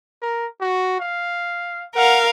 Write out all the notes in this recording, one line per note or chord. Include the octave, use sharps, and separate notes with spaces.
A#4
F#4
F5
A#4 F5 F#5